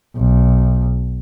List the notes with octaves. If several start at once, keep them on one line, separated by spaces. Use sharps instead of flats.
B1